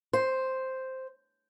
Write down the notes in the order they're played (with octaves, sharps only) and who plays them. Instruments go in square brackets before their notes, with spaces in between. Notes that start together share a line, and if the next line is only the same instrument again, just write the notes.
[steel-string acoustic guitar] C5